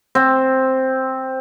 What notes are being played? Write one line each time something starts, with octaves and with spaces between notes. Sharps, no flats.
C4